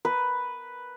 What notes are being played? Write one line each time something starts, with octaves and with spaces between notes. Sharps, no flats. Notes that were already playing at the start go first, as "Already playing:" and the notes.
B4